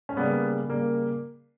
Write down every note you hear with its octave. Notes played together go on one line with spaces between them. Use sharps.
C#4
C#3 G3 A#3 B3
C#3 G3 A#3